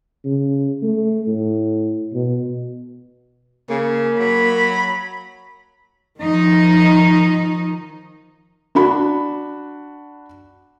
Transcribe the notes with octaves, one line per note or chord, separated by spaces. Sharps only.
C#3
A3
A2
B2
C#3 A#3
F#3 B5
D#3 F3 D#4
D4 F#4 B5